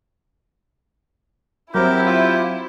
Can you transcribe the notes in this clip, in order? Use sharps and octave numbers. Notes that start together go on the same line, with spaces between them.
F#3 C4 E4 G4 A#4
F4